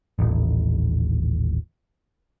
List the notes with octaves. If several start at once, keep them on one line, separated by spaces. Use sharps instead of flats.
D#1 A1